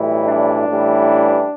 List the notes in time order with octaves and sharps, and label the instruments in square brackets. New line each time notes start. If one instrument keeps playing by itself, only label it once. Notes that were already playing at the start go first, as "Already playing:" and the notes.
Already playing: [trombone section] B1 A2 E3 G3
D4
A1 A2 E3 G3